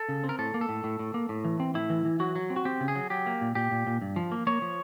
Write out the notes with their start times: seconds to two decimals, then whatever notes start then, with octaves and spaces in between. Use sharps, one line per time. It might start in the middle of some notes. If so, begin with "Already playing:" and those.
Already playing: A4
0.09 C#3
0.24 C4
0.29 A#4
0.39 A2 A4
0.54 A#3
0.61 A4
0.69 A2
0.84 A2
0.99 A2
1.14 A#3
1.29 A2
1.45 E3
1.60 C4
1.74 A2 E4
1.90 E3
2.05 E3
2.20 F#3 F#4
2.36 F#3
2.50 C4
2.56 F#4
2.65 C4 G4
2.80 C#3
2.88 G#4
2.96 F#3
3.10 F#3 G4
3.26 A#3
3.41 A#2
3.55 A#2 G4
3.71 A#2
3.87 A#2
4.02 G2
4.16 F3
4.32 A#3
4.47 A#3 C#5
4.62 F3